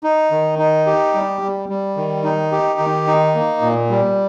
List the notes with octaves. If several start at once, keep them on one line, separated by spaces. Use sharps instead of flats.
D#4
D#3
D#4
G4
G3
G3
G3
D#3
D#4
G4
D#3
D#4
A#3
A#2
G3